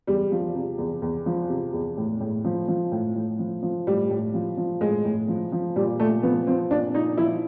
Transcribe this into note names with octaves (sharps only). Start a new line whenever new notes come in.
E2 G3
F3
C3
E2
E2
F3
C3
E2
A2
A2
F3
F3
A2
A2
F3
F3
A2 G3
A2
F3
F3
A2 G#3
A2
F3
F3
A#2 G3
A#2 A3
F3 B3
F3 C4
A#2 D4
A#2 D#4
F3 E4